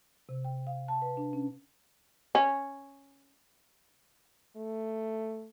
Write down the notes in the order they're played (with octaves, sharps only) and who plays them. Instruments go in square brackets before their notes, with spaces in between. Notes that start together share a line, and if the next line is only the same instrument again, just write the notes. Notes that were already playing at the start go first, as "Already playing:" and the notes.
[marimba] C3
G5
F5
A5
B4
D4
C#4
[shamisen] C#4
[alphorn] A3